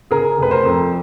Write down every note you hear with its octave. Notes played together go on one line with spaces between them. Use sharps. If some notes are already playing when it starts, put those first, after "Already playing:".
C#3 G#4 A#4
F1 B4
A#4 C5
F2